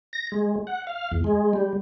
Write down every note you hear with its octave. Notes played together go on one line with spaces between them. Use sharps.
A#6
G#3
F#5
F5
E2
G#3
G3